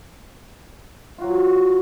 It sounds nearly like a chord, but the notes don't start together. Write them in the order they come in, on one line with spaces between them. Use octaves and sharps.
F4 F#4 F#3